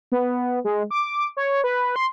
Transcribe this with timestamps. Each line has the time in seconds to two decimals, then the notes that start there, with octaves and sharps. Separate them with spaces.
0.12 B3
0.64 G#3
0.91 D6
1.37 C#5
1.64 B4
1.96 C6